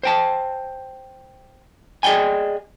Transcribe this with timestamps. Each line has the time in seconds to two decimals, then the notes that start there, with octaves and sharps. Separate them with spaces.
0.03 C5 G5 A5
2.03 G#4 D5 D#5 G5 G#5